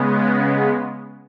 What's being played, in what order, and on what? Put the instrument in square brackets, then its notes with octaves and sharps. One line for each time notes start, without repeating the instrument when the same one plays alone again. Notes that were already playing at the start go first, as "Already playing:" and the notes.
Already playing: [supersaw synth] C#3 G#3 B3